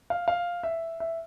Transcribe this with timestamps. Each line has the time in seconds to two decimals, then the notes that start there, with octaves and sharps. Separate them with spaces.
0.10 F5
0.28 F5
0.63 E5
1.00 E5